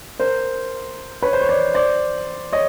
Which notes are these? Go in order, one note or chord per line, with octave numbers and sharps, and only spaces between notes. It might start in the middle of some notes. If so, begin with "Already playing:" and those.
A#4 C5
B4 C#5
C5
C#5
C5 D5
C5 D5
C#5 D#5